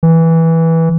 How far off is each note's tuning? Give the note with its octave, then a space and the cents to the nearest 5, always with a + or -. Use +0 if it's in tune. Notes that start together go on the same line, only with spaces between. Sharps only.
E3 -10